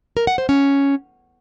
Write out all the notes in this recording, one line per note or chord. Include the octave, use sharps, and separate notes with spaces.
A#4
F#5
C5
C#4